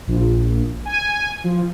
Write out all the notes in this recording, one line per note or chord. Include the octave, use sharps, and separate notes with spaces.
A#1
G#5
F3